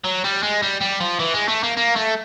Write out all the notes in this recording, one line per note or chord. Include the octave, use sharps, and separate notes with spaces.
F#3
G3
G#3
G3
G3
F3
E3
G#3
A3
A#3
A#3
A3